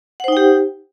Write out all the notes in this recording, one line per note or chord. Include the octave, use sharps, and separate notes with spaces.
D#4 G4 C5 F#5 G5